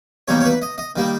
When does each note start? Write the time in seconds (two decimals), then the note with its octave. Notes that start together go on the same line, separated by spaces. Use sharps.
0.28 E2 D#3 G3 A#3 C#5
0.40 C#5
0.45 B4
0.62 D#5
0.78 D#5
0.96 D#3 G3 A#3